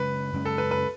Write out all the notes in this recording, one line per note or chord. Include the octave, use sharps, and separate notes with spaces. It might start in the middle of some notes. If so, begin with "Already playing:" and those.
Already playing: F#2 C#3 G#3 C#4 B4
F#2 C#3 G#3 C#4
A4
B4
B4